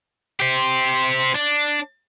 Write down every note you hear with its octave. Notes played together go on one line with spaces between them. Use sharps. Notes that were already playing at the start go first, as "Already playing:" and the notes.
G4 C5
D4